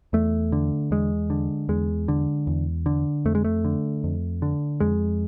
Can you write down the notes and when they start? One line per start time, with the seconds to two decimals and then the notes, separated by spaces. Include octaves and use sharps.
0.13 E2 A3
0.52 D3
0.91 E2 G#3
1.30 D3
1.69 E2 G#3
2.08 D3
2.47 E2
2.86 D3
3.25 F2 A3
3.35 G#3
3.45 A3
3.65 D3
4.04 F2
4.42 D3
4.80 F2 G#3